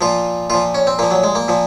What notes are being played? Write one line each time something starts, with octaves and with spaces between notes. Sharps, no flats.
A#2 F3 F4
A#2 F3 F4
C#4
C4
A#2 F3 A#3
F#3
G#3
A#3
A#2 F3